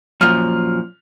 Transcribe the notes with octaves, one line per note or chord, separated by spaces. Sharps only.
F#2 A#2 F3 F6